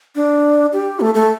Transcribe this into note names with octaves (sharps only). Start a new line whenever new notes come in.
D4
G4
A3
A3